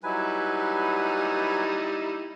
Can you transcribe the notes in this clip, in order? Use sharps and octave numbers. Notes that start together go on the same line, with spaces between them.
F#3 G3 D#4 E4 B4 G#5